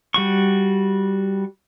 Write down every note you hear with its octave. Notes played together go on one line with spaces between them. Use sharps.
G3 F#4 C#6